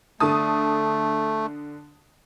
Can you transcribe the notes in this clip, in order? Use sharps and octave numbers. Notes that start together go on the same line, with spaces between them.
D3 A3 A5 D#6